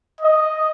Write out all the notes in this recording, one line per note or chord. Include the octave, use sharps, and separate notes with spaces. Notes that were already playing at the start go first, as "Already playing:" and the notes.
D#5